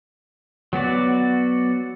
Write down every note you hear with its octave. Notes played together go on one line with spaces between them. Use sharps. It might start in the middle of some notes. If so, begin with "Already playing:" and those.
F#3 B3 F#4 D5